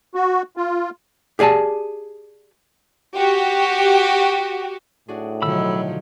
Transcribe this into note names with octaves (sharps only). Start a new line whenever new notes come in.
F#4
F4
G4 G#4 D5 G#5 A5
F#4 G4
A2 D4 F#4 G#4
B2 D3 D#3 F3 F#3 B5 E6